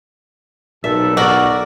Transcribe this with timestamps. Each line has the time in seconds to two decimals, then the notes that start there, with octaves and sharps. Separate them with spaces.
0.84 B1 A#2 A4 E5
1.17 F#4 A#4 D5